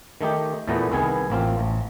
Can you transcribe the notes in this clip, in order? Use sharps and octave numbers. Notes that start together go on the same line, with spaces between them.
D#3 A3 D#4 G4
E2 A#2 E3 A3 B3 A#5
C2 D#3 B3 G#4 G#5
A1 A#3 C4 F4
A1